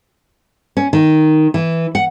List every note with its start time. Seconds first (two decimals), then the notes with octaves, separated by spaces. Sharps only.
0.77 C#4
0.93 D#3
1.54 E3
1.95 F#5